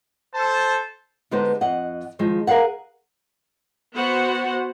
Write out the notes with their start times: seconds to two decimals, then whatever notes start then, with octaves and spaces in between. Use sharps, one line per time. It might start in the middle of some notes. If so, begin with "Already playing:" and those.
0.35 A4 C5 A5
1.31 D3 G#3 B3 D#4 G4 C5
1.61 F2 D#5 F#5
2.19 D#3 F3 G#3
2.47 G#4 A#4 B4 F5 F#5
3.95 B3 F#4 C5 F#5